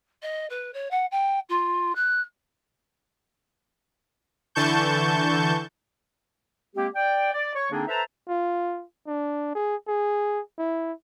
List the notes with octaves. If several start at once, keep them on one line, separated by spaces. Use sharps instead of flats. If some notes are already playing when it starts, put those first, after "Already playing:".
D#5
B4
C#5
F#5
G5
F4
F#6
D3 E3 A5 C#6 G6
G#3 A#3 C4 G4
D5 G5
D5
C#5 C#6
D3 A#3 C4 D4 D#4 G#4
A4 B4 C5 E5 A5 A#5
F4
D4
G#4
G#4
E4